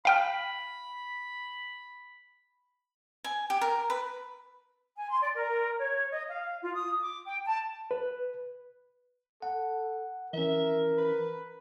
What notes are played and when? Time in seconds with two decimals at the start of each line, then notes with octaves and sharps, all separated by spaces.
0.05 F5 G5 B5 F6
3.24 G#5
3.50 G4
3.61 A#4
3.90 B4
4.97 G#5
5.10 C6
5.22 D5
5.35 A#4
5.78 C#5
6.11 D#5
6.28 F5
6.62 F4
6.74 D#6
7.00 D6
7.25 G5
7.45 A5
7.91 B4
9.42 A4 F#5
10.33 E3 C#4 A#4 E5
10.98 B4